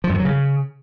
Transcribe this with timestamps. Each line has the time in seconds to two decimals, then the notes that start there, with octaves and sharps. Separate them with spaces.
0.04 F3
0.09 F#2
0.14 D#3
0.20 F#3
0.25 C#3